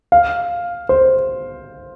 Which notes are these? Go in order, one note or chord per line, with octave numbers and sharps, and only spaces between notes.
F5
C5